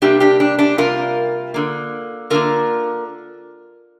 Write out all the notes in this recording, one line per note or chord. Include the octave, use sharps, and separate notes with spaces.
C3 G3 A#3 D4 G4
D4 G4
D4
D4 G4
C3 G3 A#3 F4 A#4
D3 A#3
D3 A#3 F4 A#4